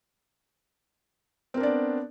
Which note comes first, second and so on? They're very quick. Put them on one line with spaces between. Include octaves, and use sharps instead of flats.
C4 A#4 D4 D5 B3